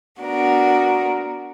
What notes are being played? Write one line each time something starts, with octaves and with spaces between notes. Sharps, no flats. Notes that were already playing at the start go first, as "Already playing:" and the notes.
B3 D4 F#4 A#4